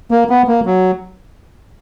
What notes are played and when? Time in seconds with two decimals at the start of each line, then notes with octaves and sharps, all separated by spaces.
0.11 A#3
0.30 B3
0.48 A#3
0.66 F#3